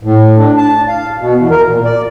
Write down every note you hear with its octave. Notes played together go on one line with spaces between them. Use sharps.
A2
D4
A5
F5
B2
E2
A#4
A#2
D5